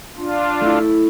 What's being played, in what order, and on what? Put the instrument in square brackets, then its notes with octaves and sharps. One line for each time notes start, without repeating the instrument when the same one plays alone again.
[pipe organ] D4 F4
[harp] A3 E4